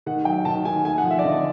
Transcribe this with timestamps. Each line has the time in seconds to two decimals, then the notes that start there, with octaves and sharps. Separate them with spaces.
0.06 D#3 F#5
0.25 F#3 G5
0.45 D#3 A5
0.65 D#3 G#5
0.85 A3 G#5
0.98 F#5
1.04 F3
1.11 E5
1.19 D5
1.24 D3 D#5